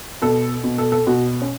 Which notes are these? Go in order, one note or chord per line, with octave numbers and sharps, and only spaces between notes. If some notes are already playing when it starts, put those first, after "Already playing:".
B2 A4
B2
A4
A4
B2 F#4
C#4